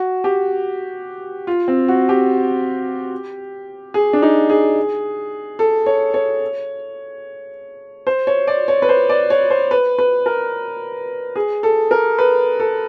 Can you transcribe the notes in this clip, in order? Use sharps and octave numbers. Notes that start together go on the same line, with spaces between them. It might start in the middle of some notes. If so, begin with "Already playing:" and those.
Already playing: F#4
G4
F4
C4
F#4
G4
G#4
D4
D#4
G#4
A4
C#5
C#5
C5
C#5
D5
C#5
B4
C5
D5
C#5
C5
B4
B4
A#4
G#4
A4
A#4
B4
A4